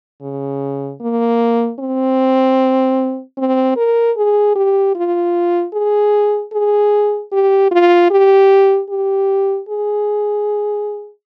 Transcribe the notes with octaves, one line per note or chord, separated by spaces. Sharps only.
C#3
A#3
C4
C4
A#4
G#4
G4
F4
G#4
G#4
G4
F4
G4
G4
G#4